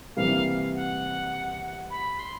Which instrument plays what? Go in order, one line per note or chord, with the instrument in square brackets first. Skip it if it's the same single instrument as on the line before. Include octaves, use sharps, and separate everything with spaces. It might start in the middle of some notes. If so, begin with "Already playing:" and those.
[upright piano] C3 E3 G3 A#3 [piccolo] F5
[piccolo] F#5
B5
C6